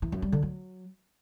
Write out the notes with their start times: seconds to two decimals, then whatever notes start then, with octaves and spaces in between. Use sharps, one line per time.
0.02 E3
0.12 F#2
0.22 G3
0.32 D3
0.43 F#3